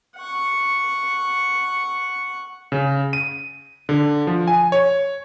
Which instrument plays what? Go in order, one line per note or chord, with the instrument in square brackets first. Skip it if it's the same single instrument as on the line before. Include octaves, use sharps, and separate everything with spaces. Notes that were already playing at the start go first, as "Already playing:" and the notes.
[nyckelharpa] F#5 C#6
[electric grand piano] C#3
D#7
D3
F3
G#5
C#5